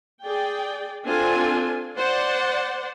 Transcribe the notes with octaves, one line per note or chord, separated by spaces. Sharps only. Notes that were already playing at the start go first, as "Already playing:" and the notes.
G#4 D5 G5
C4 D4 F4 A4 G#5
C5 D5 F#5